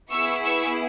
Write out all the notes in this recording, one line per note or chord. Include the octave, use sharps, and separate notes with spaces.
B3 E4 G#4 C#6 E6
C#6 E6